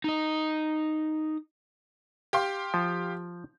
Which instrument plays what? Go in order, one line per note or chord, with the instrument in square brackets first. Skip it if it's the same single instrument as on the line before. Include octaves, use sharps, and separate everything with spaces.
[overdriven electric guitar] D#4 D#5
[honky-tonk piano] G4 F5 C6
[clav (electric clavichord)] F3